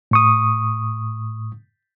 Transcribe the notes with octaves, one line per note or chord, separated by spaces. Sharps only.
A2 C#6 D#6